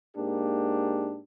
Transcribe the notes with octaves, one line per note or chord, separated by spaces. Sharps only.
G#2 A#3 D4 G4